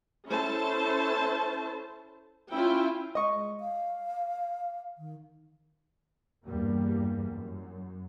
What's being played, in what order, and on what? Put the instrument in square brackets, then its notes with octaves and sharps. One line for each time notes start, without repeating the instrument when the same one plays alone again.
[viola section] C#4 E4 A4 C5 A5
C#4 E4 F4 E5 G5
[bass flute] G#3 [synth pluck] D#5 C#6
[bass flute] F5
D#3
[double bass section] E2 G2 G3 A#3
F#2